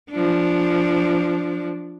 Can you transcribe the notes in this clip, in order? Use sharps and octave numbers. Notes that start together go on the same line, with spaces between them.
F3 D4